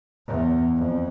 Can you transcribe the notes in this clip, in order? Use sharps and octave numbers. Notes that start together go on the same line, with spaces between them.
E2
F2